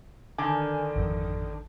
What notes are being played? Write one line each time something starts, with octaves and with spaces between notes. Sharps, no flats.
D3 D#3 G#5
G#1 F2